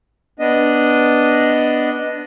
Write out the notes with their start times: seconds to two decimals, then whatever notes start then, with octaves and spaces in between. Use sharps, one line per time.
0.39 B3 D4 D#5